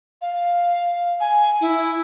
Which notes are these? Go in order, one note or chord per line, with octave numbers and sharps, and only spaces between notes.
F5
G#5
E4